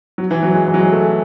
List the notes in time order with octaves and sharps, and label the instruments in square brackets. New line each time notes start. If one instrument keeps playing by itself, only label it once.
[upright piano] F#3
E3
F#3
G#3
E3
F#3
G#3
A3